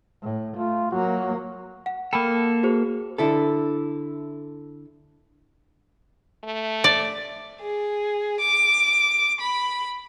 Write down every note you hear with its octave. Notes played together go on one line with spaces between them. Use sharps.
A2
A3 F4
F#3 A#3 F#4
F#5
A#3 A4 G5 A5 B5
F#4 G#4 C5
D3 E4 A4
A3
D5
G#4
D6
B5